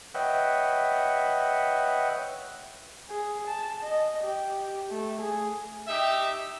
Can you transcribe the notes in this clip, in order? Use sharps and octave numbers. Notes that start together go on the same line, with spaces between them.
B4 C#5 D#5 E5 F#5 G5
G#4
A5
D#5
G4
A3
G#4
D#4 G4 E5